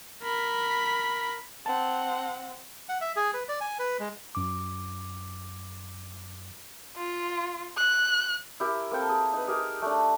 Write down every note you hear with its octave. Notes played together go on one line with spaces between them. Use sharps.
A#4 B5
C4 F#5 A5
F#5
E5
G#4
B4
D5
G#5
B4
G#3
F#2 D6
F4
F#6
E4 G4 A#4
A#3 C4 A4 G5
G#4
D#4 B4
D#4 G4 G#4 A#4
A3 D4